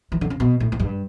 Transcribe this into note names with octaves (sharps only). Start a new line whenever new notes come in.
E3
D3
C#3
B2
A2
A2
G2